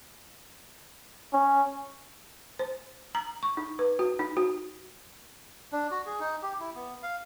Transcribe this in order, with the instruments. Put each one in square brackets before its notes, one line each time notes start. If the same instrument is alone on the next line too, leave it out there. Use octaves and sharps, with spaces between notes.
[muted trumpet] C#4
[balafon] C5
A#5
C#6
D#4
B4
F#4
D#4
F#4
[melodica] D4
F#4
G#4
D#4
G4
E4
B3
F5